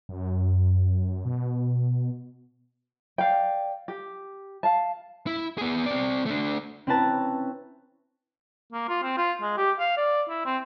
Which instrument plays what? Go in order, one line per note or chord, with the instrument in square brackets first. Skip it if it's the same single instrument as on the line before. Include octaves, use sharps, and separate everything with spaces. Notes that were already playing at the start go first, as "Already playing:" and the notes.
[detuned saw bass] F#2
B2
[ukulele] D5 F5 G5
G4
F5 A5
[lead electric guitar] E4
B3 G#4
C4 D5
A3 D4
[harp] C4 C#4 E4 B4 A5 A#5
[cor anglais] A#3
F4
C4
F4
G#3
G4
F5
D5
E4
C4